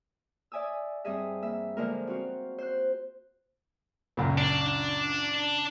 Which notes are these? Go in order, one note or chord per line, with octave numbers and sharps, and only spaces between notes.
D5 E5 G#5 D#6 E6
G2 G3 C4 G#4 D#5 E5
E3 A#3 E5
D3 F3 G#3 A#3 B3 A#4
C4 F4 F#4 F5
C5 F#6
C#2 F#2 A#2
D4